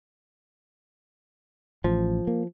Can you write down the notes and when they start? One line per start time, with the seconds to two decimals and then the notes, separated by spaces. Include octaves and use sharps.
1.84 A1 F3
2.27 A#3